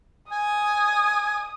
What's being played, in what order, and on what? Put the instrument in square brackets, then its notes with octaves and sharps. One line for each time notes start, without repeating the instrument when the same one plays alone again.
[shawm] G#5 [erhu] D#6